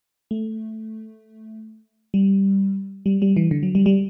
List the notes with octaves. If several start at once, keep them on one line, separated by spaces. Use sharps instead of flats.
A3
G3
G3
G3
E3
D3
F#3
G3
G3